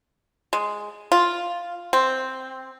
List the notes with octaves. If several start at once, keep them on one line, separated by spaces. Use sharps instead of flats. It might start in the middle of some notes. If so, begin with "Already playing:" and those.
G#3
F4
C4